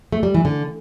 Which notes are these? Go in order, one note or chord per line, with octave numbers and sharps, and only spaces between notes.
A3
G3
E3
D3